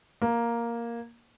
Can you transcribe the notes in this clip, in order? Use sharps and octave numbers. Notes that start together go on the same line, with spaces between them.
A#3